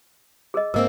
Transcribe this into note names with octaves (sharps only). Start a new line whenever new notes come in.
G#4 A#4 D#5
G#2 A#3 C4 A#4 D#5 E6